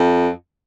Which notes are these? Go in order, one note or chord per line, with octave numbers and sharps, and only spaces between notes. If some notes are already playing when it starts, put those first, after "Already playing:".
Already playing: F2